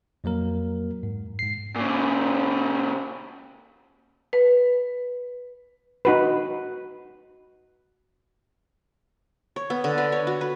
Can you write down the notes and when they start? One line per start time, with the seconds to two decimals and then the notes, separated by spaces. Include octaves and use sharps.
0.24 F2 F#3 A#3 A#4
1.03 G#2
1.39 G#2 C7
1.76 A#2 C#3
4.33 B4
6.05 D#4 F#4 B4
9.56 C#5
9.70 B3
9.84 D3
9.98 B4
10.12 C#5
10.27 F#4
10.41 B4